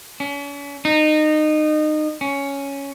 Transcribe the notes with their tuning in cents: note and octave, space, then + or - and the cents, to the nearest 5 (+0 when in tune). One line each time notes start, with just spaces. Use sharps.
C#4 +40
D#4 -25
C#4 +5